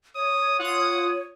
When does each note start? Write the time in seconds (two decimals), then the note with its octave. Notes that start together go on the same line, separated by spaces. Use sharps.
0.16 C#5 D#6
0.59 F4 F#5 D#6